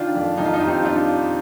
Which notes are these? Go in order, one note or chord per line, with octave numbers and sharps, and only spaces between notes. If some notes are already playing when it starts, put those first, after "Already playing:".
Already playing: D#3 D4 F4
F2
F2 D#4
F4
D#4
G3 F4
C4 D#4
D4 F4